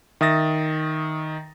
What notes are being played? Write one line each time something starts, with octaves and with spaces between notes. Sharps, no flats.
D#3 E5 D#6 A6 A#6